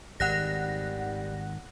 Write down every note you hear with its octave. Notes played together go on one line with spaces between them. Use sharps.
G#1 D#3 G3 F#5 F#6 A#6